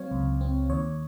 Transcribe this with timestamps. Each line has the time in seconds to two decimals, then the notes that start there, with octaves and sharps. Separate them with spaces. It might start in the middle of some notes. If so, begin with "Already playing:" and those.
Already playing: F#3 C4 C#5 F5
0.11 C#2
0.41 C4
0.69 D#2 C#5